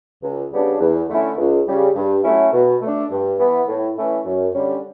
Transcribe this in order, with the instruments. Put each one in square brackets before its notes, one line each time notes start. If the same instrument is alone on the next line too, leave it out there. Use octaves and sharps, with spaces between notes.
[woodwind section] C#2
C#3 G3 B3 D4
E2
D3 A3 C#4 E4
C#2
C#3 G3
G2
F#3 A3 C#4 E4
B2
A3 D4
G2
E3 B3
A2
E3 A3 C#4 E4
F#2
D3 G3 C#4